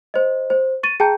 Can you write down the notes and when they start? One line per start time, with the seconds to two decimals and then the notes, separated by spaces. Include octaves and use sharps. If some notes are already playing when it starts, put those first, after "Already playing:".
0.14 C5 D#5
0.50 C5
0.83 C#6 A6 D#7
1.00 G#4 G5 A5 A#5 G6